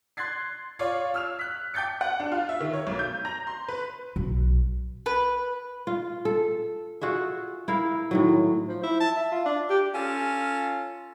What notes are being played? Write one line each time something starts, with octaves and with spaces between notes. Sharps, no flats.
C6 F#6 G#6 A6 C7
F4 C#5 D5 F5
E6 F6 F7
F#6 B6
G5 D6 G6 A6 C#7
F#5
D4
F4
E5
D#3
C#5
B1
G6
A#5
C6
B4
B1
B4
F4
A4
F4 F#4 G#4 E5
E4 A#4 F5
A2 D#3 F#3
F3
E4
A5
E5
F4
D4
G4
C#4 F4 A4